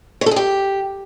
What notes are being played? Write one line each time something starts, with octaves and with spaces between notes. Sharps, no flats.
C#5
A4
G#4
G4